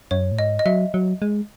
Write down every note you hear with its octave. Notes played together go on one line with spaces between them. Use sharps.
F#2 C#5
A2
G#2 D#5
D#5
F#3 E5
F#3
G#3